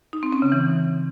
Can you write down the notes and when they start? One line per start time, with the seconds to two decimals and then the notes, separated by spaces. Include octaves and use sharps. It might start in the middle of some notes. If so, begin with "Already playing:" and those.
0.13 D#4
0.23 C4
0.32 C#4
0.42 C#3
0.52 E3